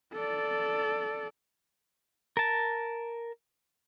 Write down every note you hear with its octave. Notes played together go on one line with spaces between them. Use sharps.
A4 D5
A#4 A5